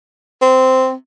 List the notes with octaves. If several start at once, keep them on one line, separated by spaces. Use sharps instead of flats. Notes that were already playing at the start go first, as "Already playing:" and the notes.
C4